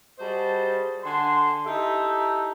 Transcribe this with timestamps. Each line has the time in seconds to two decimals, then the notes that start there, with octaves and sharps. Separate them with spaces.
0.19 G3 F#4 G#4 C5 D#5 A5
1.04 D3 F#5 G#5 A5 C6
1.66 D#4 E4 G4 A4 D#5 E5